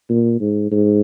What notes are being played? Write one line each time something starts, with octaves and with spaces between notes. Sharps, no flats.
A#2
G#2
G#2